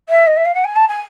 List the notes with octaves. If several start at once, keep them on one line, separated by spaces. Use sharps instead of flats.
E5
D#5
E5
F5
F#5
G#5
A5
G#5